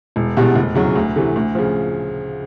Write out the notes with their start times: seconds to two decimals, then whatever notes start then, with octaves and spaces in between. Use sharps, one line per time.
0.16 E1
0.37 E2 B2 G3
0.55 F1
0.75 E2 C#3 F#3
0.95 D2
1.16 C3 E3 A3
1.36 D2
1.55 C#3 F3